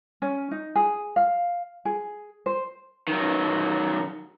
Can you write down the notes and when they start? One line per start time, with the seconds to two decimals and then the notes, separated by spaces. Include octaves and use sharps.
0.22 C#4
0.51 D#4
0.75 G#4
1.16 F5
1.85 G#4
2.46 C5
3.08 D#3 F#3